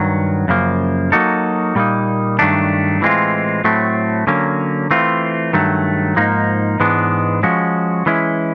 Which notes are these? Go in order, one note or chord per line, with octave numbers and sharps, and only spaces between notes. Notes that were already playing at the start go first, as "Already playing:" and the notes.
Already playing: G2 D#3 F#3
F#2 C#3 F3 A#3
F#3 A#3 D#4 F#4 A4
A#2 G3 A#3 D#4
G2 D#3 F#3 A3 D4
A2 E3 G#3 C4 F4
A2 F#3 A3 C4
D3 F#3 A#3 C#4
E3 A3 C4 F4
G2 D#3 F#3 A3
G#2 F3 A#3 D#4
G#2 E3 G#3 B3 D4
F3 G#3 C#4 F#4
E3 G#3 C#4 E4